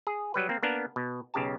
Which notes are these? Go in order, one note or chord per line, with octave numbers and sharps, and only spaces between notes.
G#4
F#3 G3 B4
A#3 C4
A#3 B3 D4 A#4
B2
B1 C#3 G4 A5